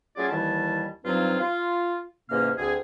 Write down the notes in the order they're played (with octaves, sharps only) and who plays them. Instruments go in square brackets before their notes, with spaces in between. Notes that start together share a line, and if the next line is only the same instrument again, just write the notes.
[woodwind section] F#3 A3 C#4 F4 G#4 D5
D#2 D#3 E3 G3 E4 A5
G2 F3 F#3 C4 D#4 F4
F4
E2 G#2 C3 A#3 C#4 F6
D2 C4 G#4